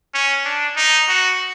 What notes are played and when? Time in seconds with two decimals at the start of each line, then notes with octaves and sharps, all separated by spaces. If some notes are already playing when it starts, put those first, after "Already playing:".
0.14 C#4
0.45 D4
0.76 D#4
1.09 F#4